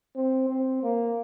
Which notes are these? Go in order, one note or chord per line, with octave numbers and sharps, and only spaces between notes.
C4
C4
A#3